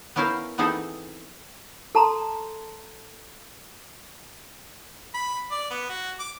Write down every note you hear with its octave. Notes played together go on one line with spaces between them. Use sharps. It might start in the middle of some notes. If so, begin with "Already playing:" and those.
B3 C#4 E4 A#4 C5 F5
E3 B3 C4 D#4 G#4 A4
A4 A5 A#5 C6
B5
D5
B3
F#4
D6